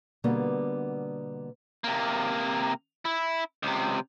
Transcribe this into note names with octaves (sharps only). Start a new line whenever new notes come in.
B2 D3 G3 A#3 B3
C3 A#3
E4
C#2 C3